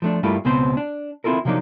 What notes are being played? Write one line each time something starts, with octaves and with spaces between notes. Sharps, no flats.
F3 A3 D4
G2 G3 A3 A#3 E4 F4
C#2 B2 B3 C4 C5
D4
C4 E4 F4 A4 A#4
C3 F3 F#3 A#3 D4 D#4